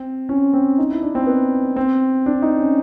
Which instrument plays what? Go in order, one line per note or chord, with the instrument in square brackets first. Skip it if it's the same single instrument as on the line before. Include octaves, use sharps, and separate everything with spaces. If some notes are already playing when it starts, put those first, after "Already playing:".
Already playing: [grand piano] C4
C#4
C4
D#4
E4
D4
C4
B3
C4
D4
D#4
C#4